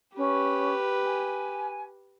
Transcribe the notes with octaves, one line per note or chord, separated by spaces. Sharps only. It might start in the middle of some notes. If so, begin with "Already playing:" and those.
C#4 G4 B4
G#5